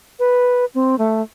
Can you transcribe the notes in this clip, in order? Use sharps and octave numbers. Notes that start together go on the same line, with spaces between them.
B4
C4
A3